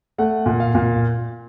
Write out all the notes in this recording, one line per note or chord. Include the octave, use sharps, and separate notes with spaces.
A3 F#5
A#2
F5
A#2